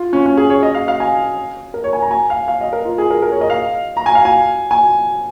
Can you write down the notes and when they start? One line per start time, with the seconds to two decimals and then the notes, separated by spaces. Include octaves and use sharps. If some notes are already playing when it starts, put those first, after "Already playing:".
Already playing: F4
0.13 C#4
0.26 C#4
0.37 G#4
0.50 C#5
0.63 D#5
0.75 F5
0.88 F5
1.00 G#5
1.74 A#4
1.84 C#5
1.93 G#5
2.02 A#5
2.11 G#5
2.30 F5
2.48 F5
2.61 D#5
2.73 A#4
2.85 F4
2.98 G#4
3.10 A#4
3.22 A#4
3.32 C#5
3.41 D#5
3.50 F5
3.97 A#5
4.06 G#5
4.15 F5
4.25 G#5
4.71 G#5